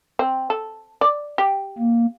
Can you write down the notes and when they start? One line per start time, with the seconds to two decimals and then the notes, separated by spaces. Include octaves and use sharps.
0.19 C4
0.50 A4
1.01 D5
1.38 G4
1.78 A#3